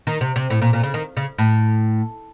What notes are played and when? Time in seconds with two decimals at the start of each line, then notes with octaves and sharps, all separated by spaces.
0.07 D#3
0.21 C3
0.36 C3
0.50 A2
0.61 A#2
0.73 A#2
0.83 C#3
0.94 D#3
1.17 C#3
1.38 A2